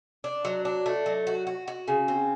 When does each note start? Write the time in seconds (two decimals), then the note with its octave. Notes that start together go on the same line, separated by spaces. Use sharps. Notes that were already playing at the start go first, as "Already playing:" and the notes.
0.24 D4
0.45 F#3
0.65 D4
0.86 A3
1.06 F#3
1.27 F#4
1.47 F#4
1.68 F#4
1.88 C#3
2.08 C4